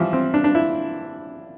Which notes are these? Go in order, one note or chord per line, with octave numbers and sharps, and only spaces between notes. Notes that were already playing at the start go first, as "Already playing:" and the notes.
Already playing: E3 F3 G3
C4
D4
D4
E4